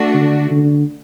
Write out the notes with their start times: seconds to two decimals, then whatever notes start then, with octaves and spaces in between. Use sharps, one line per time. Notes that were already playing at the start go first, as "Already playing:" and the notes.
Already playing: A3 D4 F#4
0.14 D3
0.51 D3